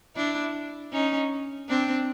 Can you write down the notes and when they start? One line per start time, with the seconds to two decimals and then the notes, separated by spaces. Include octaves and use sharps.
0.16 D4 E4
0.93 C#4 D#4
1.69 C4 D4